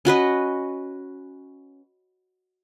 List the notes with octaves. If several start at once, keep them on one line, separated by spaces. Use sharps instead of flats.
C#4 F#4 B4 D#5